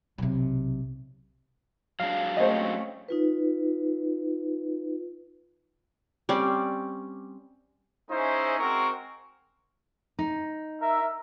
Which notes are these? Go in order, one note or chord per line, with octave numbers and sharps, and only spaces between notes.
B1 C3
F#3 G#3 D4 F5
A3 C4 C#4 C5 D#5
D#4 F4 B4
G3 C4 C#4 D5
G#3 C#4 D#4 E4 C5
G#3 C4 F#4 A#4 C#6
D#4
A#4 E5